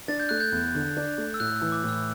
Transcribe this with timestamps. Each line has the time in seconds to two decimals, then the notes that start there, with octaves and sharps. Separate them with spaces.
0.08 D4 A6
0.20 G6
0.29 A3 F#6
0.40 G6
0.52 E2
0.75 D3
0.97 D4
1.18 A3
1.34 E6
1.40 A2 F#6
1.56 E6
1.62 E3
1.72 D6
1.84 A2 E6